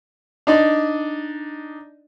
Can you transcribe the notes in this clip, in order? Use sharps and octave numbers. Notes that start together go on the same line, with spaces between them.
D4 D#4 D5